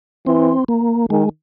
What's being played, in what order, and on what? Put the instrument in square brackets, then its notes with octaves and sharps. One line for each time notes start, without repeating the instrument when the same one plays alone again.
[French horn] E3 [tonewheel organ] C4
[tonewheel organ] A#3
[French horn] D#3 [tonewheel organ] G#3